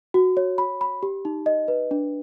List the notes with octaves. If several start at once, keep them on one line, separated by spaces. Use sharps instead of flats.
F#4
C#5
B5
B5
G4
D#4
D#5
B4
D4